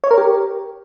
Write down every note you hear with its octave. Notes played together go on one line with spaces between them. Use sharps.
C#5
A#4
G4